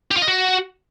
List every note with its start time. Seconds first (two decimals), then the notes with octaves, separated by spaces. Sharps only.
0.11 G4
0.17 F4
0.22 D#5
0.28 F#4